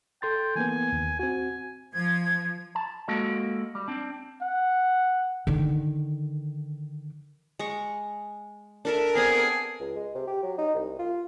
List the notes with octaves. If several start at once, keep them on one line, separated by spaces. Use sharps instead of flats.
A4 G5 C6 A6
E3 A#3 B3 G#5
D#2
C4 F#4 G#5
F3 G#6
A5
G#3 A#3 F#4 A4 D#5
G3
C4 D4
F#5
D3 D#3
G#3 A#5 C#6
D4 A4 A#4 E5
B3 C4 D4 G#4
C#2
G#3
C3
G4
F#3
D#4
C2
F4